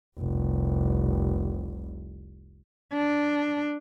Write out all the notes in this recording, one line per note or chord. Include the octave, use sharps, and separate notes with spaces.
F1 C2
D4